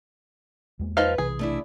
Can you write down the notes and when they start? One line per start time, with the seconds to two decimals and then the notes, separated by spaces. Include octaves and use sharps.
0.79 E2 G#3 A#3
0.97 F3 D#4 B4 F5
1.18 B1 C3 E3 G#4
1.39 A3 D4 E4